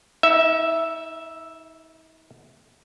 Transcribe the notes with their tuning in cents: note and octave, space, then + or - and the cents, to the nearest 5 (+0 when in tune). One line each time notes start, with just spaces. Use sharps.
D#4 +45 E5 +0